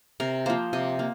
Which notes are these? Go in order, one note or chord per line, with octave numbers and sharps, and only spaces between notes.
C3 A#4
F3 A#3 C5
C3 D#5
A#3